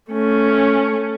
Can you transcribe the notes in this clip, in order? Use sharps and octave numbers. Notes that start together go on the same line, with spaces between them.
A3 C#4